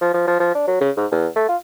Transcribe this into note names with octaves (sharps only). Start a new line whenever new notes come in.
F3
F3
F3
F3
D4
F#3
C#3
G#2
E2
A3
F4